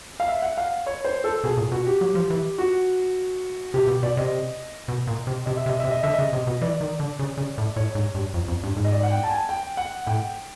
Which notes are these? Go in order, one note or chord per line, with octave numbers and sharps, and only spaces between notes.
F5
E5
F#5
F5
C#5
C5
A4
B2 G#4
A#2
B2 F#4
G4
F#3
F3
E3
F#4
C3 G4
B2
B2 D5
C3 D#5
B2
A#2
C3
C3 D#5
E5
C3
D#5
C3 E5
D#5
D3 E5
D#5
C#3
C3
B2
E3 D5
D#3
D3
C#3
C#3
A2
A2 C#5
G#2
G2
F2
F2
G2
G#2
D#5
D5
F#5
G5
A5
G#5
G5
F#5
A2 G5